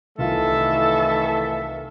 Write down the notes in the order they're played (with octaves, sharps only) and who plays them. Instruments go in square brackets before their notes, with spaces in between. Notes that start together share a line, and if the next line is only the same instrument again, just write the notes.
[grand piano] C2 F4 [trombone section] D#3 E3 A3 [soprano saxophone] A4 [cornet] E5